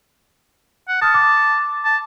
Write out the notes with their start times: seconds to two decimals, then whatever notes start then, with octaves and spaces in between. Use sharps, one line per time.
0.89 F#5
1.02 A5 D#6 F6
1.14 D6
1.85 A5